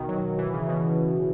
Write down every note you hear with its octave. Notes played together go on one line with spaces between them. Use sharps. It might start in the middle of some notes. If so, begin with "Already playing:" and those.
Already playing: B2 D#3
F#3
E3
C#3
B2